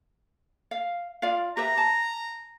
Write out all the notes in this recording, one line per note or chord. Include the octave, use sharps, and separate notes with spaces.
F5
F4 D5 F5
G4 B4 E5 A#5
A5